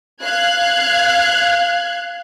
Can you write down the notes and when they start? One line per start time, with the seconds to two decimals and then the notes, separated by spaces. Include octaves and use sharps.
0.23 F5 F#6 G#6